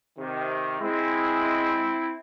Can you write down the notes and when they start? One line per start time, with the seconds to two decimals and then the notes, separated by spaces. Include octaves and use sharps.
0.18 C3 D#3
0.81 G#3 C4 E4